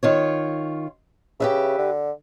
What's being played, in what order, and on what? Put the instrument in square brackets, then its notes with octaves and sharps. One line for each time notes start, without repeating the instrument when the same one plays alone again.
[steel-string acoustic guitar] D#3 F4 C#5
[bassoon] C#3 [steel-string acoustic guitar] G4 B4 E5
[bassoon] D3